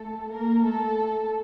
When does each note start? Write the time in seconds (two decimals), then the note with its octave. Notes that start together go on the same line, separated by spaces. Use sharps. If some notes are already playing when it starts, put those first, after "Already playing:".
Already playing: A3 A4
0.31 A#3 A#4
0.64 A3 A4